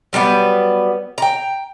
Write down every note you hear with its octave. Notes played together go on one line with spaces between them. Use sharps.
F#3 G3 A#3 B3
G5 A#5